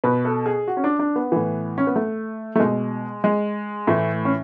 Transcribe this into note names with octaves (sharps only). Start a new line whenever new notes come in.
B2 B4
A4
G#4
F#4
C#4
D4
D4
B3
A2 E3
C#4
B3
A3
A3
B2 G#3
G#3
A2 E3 A3
C#4